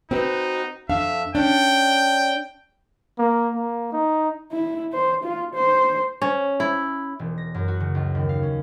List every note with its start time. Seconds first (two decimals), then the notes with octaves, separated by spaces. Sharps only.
0.11 C4 D#4 F#4 B4
0.89 F2 D4 E5 F5
1.35 C#4 D4 G5
3.18 A#3
3.54 A#3
3.92 D#4
4.52 E4
4.93 C5
5.24 F4
5.54 C5
6.22 C#4
6.60 E4
7.19 E1
7.38 A#6
7.54 F#2
7.68 F#4
7.80 C#3
7.95 C#2
8.15 D#2
8.29 F5
8.43 C#4